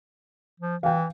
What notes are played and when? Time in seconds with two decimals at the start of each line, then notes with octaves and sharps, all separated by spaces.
0.60 F3
0.83 E3 F5 G5